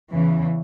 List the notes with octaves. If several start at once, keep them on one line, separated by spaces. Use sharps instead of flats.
E2 C#3 E3